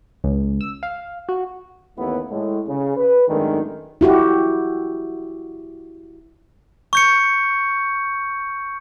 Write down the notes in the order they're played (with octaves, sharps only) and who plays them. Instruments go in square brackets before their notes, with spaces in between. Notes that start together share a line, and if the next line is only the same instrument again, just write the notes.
[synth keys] C#2
E6
F5
F#4
[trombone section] A1 D#2 A2 B3 E4 B4
A2 G#3
C#3
B4
G#1 F#2 D#3 G#3 A3 D4
[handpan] E4 F#4 G4
[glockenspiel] C#6 G6 C#7